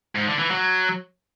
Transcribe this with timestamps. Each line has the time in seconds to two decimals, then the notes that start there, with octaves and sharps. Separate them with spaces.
0.16 G#2
0.27 D3
0.39 E3
0.51 F#3